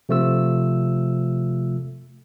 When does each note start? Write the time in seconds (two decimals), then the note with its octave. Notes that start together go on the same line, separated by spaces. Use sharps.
0.09 C3 F3 A3 F4 E6